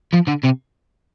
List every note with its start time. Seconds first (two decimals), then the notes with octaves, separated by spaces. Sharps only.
0.14 F3
0.28 D3
0.44 C3